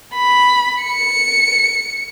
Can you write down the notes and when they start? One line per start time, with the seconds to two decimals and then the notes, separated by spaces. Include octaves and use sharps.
0.14 B5
0.84 C#7